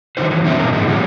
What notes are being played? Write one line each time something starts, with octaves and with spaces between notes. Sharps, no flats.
D3 D#3 F3 F#3 D#4 C5
E3 F#3
B2 D#3 G3 C#4 E5 A5
G#2 B2 D#4 A#4
A2 D3 F3 G#3 B3
A#2 F3 G3 C#4